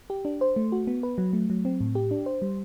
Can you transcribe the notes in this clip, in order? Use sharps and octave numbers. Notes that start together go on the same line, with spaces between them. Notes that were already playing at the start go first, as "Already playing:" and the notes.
G4
D4
C5
A3
F#4
B3
B4
F#3
A3
F#3
C4
A2
G4
D4
C5
G3